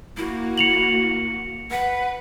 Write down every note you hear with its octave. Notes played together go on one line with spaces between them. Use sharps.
A#3 E4 F#4
C#7 F7 F#7
B4 F#5